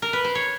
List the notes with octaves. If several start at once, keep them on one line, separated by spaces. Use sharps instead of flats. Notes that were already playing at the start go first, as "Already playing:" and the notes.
A#4
B4
C5
C#5